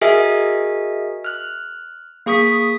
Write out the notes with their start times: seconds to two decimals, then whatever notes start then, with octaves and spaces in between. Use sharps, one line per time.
0.01 F#4 G#4 A#4 D#5 E5 G#5
1.24 F6 F#6
2.26 A#3 G#4 C#6 D#6 B6